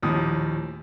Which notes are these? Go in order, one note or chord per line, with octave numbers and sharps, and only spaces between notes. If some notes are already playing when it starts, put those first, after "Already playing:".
A#1 D#2 A2 D#6